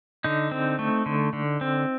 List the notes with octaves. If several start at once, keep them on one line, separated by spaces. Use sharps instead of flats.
D3 D#4
C4
A3
D3
D3
C4